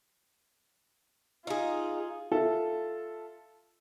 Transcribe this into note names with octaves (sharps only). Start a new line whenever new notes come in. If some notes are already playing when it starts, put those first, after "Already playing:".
D#4 F4 G#4
F4 A4 E5